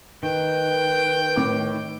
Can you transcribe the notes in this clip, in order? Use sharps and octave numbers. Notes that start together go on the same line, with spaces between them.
D#3 B4 G5
A2 D6